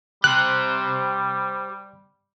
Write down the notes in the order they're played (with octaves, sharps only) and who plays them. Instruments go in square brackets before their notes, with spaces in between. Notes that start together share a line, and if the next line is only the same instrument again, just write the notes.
[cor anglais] G3 [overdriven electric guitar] G4 C5 [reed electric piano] F#6